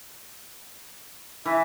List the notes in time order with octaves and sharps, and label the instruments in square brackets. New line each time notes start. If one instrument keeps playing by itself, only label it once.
[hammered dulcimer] E3 [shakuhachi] E5